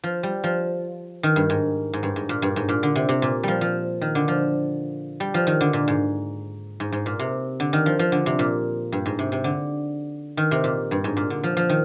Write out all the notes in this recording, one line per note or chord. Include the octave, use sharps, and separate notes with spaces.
F3
G3
F3
D#3
G2
G#2
G#2
G2
G#2
A#2
G2
G#2
A#2
D3
C3
C3
A#2
F3 G3
F3
D#3
D3
F3
G3
F3
D#3
D3
A#2
G#2
G#2
G#2
A#2
C3
D3
D#3
F3
F3
D3
C3
A#2
G2
G#2
C3
C3
D3
D#3
C3
A#2
G2
G#2
A#2
D3
F3
F3
D#3